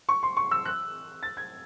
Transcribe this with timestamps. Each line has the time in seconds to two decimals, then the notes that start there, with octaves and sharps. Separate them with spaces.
0.09 C#6
0.23 C6
0.37 C#6
0.51 E6
0.65 F#6
1.23 A6
1.37 G#6